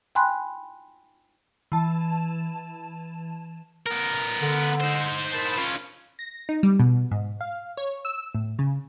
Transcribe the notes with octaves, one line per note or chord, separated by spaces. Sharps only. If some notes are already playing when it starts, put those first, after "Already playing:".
G5 G#5 B5 C6 F#6
E3 A5
B3 A#4
D3
D#4 C5
A#4 A5 B5
C#4 F4
A#6
D#4
G3
B2
G#2
F5
C#5
E6
A2
C#3